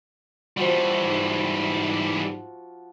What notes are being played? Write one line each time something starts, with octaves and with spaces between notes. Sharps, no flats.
E3 F3 G3 F#4
G#2